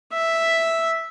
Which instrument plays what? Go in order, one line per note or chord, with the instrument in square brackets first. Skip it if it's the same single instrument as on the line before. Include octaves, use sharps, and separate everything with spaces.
[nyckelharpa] E5